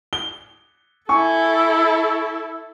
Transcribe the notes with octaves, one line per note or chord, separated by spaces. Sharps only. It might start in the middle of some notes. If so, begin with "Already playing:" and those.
G7
E4 A4 G#5 C#6